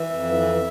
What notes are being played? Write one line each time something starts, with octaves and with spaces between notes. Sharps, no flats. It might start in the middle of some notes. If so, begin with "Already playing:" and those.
Already playing: E3 E5
F2
E3